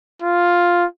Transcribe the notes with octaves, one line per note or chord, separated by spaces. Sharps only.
F4